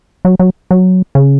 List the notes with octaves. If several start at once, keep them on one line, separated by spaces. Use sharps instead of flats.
F#3
F#3
F#3
C#3